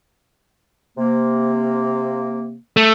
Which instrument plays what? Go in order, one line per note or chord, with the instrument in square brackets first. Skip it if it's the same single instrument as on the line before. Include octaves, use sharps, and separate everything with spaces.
[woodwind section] C3 A#3
[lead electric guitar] A3